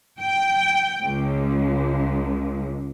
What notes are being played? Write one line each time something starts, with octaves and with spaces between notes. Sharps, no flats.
G5
C#2